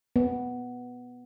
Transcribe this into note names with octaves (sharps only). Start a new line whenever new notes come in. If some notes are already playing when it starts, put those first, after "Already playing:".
B3